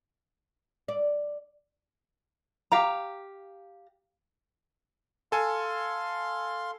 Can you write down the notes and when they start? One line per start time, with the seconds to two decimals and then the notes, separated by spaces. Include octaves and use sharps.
0.88 D5
2.72 G4 F5 A#5
5.32 A4 F5 G#5 C6